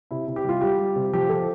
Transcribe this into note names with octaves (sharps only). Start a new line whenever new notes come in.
C3 E4
C3
G4
G3 F4
G3 G4
G3
C3
F3 G4
F3 A4